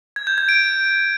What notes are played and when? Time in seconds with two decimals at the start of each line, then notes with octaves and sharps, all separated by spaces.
0.16 G#6
0.27 G6
0.38 G#6
0.49 D7